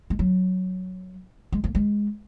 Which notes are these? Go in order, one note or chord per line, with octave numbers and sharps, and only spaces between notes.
G#3
F#3
G#3
A#3
G#3